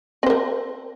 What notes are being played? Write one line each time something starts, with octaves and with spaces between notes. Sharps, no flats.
C4 A#4 C5